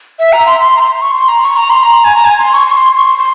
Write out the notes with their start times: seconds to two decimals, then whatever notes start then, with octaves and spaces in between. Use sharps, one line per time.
0.19 E5
0.33 A#5
0.46 C6
0.60 C6
0.77 A#5
0.81 C6
1.02 C#6
1.15 C6
1.28 A#5
1.42 C#6
1.56 A#5
1.70 C6
1.83 A#5
2.04 G#5
2.15 A#5
2.25 G#5
2.38 C6
2.53 C#6
2.66 C6
2.71 C#6
2.77 C6
2.97 C#6
3.07 C6
3.18 C6